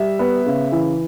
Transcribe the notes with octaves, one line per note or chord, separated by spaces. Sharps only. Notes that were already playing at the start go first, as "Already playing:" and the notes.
Already playing: G3 E5
B3
C#3
E3